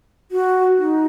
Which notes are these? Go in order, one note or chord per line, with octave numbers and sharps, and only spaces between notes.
F#4
D#4